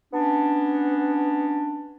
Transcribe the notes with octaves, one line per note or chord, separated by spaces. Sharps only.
B3 C#4 D4